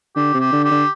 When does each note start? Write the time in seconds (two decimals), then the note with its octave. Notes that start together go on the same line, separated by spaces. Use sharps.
0.16 D3 G4
0.34 C3
0.40 G4
0.52 D3
0.64 G4
0.71 D3